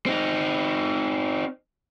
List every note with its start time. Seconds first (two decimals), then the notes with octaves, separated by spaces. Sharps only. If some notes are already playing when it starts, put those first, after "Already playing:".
0.06 C4 D#4